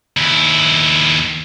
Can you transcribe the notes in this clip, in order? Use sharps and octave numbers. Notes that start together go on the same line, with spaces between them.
D#2 E4